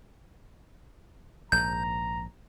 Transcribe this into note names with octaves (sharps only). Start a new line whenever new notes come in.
A#1 G#2 A#5 G6